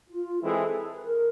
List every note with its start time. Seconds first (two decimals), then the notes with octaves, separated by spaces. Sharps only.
0.09 F4
0.42 E3 G#3 C4 E4 G#4 A4
0.96 B4
1.05 A#4